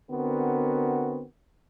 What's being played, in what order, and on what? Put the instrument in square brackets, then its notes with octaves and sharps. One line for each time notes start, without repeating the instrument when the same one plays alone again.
[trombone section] D3 B3 C4 F#4 A#4